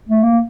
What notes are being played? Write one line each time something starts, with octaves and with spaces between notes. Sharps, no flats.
A3
A#3